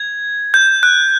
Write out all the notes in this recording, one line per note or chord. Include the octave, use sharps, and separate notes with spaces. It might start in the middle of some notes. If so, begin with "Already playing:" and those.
Already playing: G#6
G6
F#6